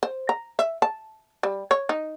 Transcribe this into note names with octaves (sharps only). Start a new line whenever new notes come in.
C5
A#5
E5
A5
G3
C#5
D#4